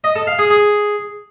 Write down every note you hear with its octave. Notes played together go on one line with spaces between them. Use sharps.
D#5
A4
F5
G#4
G#4